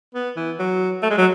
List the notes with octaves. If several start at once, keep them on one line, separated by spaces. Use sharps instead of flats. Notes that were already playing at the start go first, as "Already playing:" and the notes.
B3
E3
F#3
A3
G#3
F#3